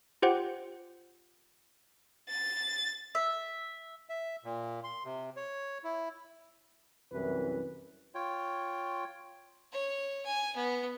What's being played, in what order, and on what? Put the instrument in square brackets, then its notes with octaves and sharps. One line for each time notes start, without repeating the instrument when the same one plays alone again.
[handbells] F4 G4 C5 F#5 G5
[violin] A6
[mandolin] E5
[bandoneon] E5
A#2
C6
C3
C#5
E4
[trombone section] C2 F#2 E3 B4
[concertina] F4 C#5 G5
[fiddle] C#5
G#5
B3